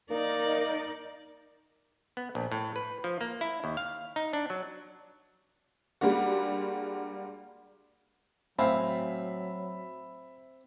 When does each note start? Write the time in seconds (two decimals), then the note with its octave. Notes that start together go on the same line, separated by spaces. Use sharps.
0.11 A#3 D#4 A#4 D5
2.17 B3
2.35 A#1
2.52 A2
2.76 B4
3.04 F3
3.21 A#3
3.41 E4
3.64 D#2
3.77 F5
4.16 D#4
4.33 D4
4.50 F#3
6.01 G3 G#3 A#3 D4 F#4
8.59 A2 F#3 C4 E5 F5 G#5 B5